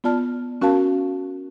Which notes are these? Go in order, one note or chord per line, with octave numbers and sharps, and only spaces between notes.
B3 F4 D5 A5 F6
C#4 F#4 A#4 F5 A5